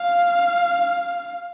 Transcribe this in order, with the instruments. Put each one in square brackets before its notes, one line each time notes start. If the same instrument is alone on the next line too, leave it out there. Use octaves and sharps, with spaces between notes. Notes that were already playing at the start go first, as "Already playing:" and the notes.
Already playing: [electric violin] F5